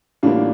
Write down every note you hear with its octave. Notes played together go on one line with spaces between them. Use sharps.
A1 A2 G3 A#3 D4 F4